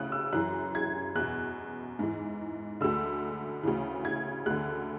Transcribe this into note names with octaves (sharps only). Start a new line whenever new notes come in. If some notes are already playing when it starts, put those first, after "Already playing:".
Already playing: D2 C#3 E3 F#6
E6
F#2 E3 F#6
G#6
E2 B2 F#6
G#2 E3
D2 D3 E6
D2 C#3 E3
G#6
D2 D3 F#6